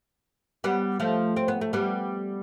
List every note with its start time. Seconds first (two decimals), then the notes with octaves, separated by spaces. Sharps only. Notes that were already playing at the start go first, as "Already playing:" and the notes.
0.64 G3 B3
1.00 F3 A3
1.36 C4
1.48 B3
1.61 A3
1.73 G3 B3